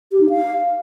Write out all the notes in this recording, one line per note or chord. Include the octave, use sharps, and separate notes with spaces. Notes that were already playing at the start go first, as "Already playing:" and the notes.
G4
D#4
F5